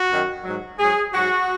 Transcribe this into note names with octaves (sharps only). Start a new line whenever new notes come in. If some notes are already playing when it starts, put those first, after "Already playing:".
Already playing: F#4
F#2 D#3 F#3
G#2 F#3
G#2 F#3 G#4
G#2 F#3 F#4